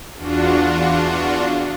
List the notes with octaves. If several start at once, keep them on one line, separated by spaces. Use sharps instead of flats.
E2 D4 F4 F#4